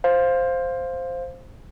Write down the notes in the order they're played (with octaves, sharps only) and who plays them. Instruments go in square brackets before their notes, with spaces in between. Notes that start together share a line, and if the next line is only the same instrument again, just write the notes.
[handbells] C5 F5